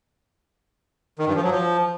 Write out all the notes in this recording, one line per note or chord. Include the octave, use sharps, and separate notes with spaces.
D#3
G2
F3
F#3
F3